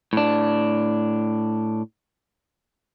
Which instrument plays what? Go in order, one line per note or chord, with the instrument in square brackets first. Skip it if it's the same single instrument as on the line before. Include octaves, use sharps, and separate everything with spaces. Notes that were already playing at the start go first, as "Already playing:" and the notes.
[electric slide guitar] A2 D4